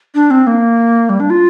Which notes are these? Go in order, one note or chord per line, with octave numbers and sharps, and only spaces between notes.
D4
C4
A#3
G3
D4
F4